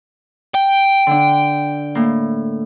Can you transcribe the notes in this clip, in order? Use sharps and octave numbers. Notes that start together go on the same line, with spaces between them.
G5
D3 D4
A2 A#3